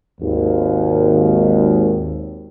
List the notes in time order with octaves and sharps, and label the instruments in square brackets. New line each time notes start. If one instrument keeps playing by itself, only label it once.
[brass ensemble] G#1 D#2